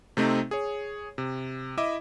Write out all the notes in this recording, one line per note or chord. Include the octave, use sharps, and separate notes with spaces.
C3 A3 C4 D#4
G#4 C#5
C3
E4 D#5 E5 D6